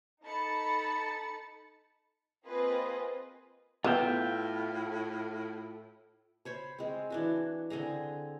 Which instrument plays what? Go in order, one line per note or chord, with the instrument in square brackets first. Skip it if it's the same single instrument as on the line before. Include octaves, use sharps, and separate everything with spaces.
[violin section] D#4 A4 A5 B5 A6 C#7
A#3 C4 F4 G#4 B4 D#5
[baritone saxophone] A2 [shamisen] B3 [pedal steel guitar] F4 E5 G5
[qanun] C5 C#5 B5
G#3 C4
E3 D4 F#4
D3 C4 G#4 A#5